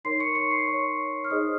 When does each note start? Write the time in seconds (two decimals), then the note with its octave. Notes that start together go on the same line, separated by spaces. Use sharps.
0.05 D#4 A#4 C#5 C6 C7
0.20 C#6 C#7
0.35 C#6 C#7
0.51 C6 C7
0.67 C#5 C#6
1.24 F6
1.30 D#4 G#4 C5 D#5 D#6